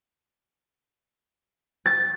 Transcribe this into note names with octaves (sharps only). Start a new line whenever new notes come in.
A6